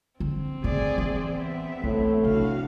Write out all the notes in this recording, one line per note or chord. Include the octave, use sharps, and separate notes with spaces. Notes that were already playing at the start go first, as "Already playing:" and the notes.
D3 C4
A2 D#3 G#4 D5
E3
B3 E5
B1 A2
C3 D4 F#4 F5